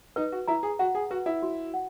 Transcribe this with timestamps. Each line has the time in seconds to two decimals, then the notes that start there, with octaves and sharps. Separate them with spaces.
0.16 D#4 B4
0.32 F#4
0.48 E4 A#5
0.63 G#4
0.79 F#4 F#5
0.95 G#4
1.11 F#4 B4
1.26 E4
1.43 F#4
1.74 F#5